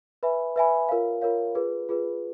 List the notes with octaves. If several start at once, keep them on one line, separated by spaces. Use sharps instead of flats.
B4 E5 G#5 B5
B4 E5 G#5 B5
F4 A#4 C#5 F5
F4 A#4 C#5 F5
F4 G#4 B4
F4 G#4 B4